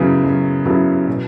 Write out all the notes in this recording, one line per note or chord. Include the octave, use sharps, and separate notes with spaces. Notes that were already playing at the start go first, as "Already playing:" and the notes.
Already playing: F#2 C#3 F#3 B3 E4
F#2
C#3 F#3 B3 E4
B2